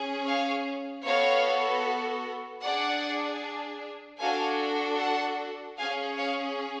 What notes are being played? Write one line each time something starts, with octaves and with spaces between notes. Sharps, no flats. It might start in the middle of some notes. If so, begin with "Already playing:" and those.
Already playing: C#4 G#4
C#5 F5
B3 F#4 A4 C#5 F5
D4 G#4 D5 F#5
D4 F#4 A4 F5 G#5
F#5 A5
C#4 G#4 F5 G#5
C#5 F5